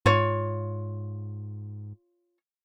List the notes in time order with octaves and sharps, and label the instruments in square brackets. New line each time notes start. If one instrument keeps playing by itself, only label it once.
[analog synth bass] G#2 [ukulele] F4 C#5